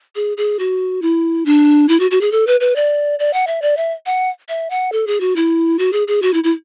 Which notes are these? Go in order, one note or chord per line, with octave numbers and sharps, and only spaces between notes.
G#4
G#4
F#4
E4
D4
E4
F#4
F#4
G#4
A4
B4
B4
D5
D5
F#5
E5
D5
E5
F#5
E5
F#5
A4
G#4
F#4
E4
F#4
G#4
G#4
F#4
E4
E4